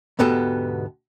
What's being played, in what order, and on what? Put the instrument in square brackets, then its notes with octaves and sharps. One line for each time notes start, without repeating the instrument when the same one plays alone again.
[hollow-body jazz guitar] D2 G#2 B2 B3 G4 A4